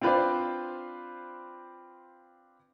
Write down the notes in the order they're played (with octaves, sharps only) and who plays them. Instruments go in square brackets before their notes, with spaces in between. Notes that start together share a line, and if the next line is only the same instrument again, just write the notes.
[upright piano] C4 D4 F4 B4 C5 D5